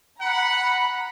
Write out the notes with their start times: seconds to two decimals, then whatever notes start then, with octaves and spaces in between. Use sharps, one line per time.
0.20 F#5 A#5 B5